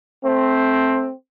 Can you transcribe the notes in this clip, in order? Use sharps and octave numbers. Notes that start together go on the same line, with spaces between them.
A3 C4